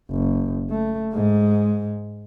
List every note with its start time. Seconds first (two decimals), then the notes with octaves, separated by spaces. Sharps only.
0.11 F#1
0.70 A3
1.14 G#2 G#3